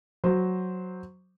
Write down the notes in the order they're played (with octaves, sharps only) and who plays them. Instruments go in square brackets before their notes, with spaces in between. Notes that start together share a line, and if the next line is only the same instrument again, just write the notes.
[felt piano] F#3 C5